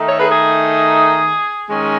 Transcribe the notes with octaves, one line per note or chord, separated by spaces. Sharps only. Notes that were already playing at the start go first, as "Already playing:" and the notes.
Already playing: D#3 A3 D#4
A4 C#5
G#4 B4
G#4
D#3 G#3 C#4